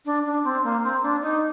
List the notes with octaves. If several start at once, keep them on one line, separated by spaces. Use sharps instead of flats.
D4
D4
C4
A#3
C4
D4
D#4